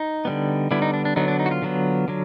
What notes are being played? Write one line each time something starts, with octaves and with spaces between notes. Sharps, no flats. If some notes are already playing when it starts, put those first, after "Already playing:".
Already playing: D#4
D3 G3 B3
D3 G3 B3 E4
D#4
D4
D4
D3 F#3 B3 D#4
D4
D#4
F#4
F4
D3 F#3 B3
D3 F#3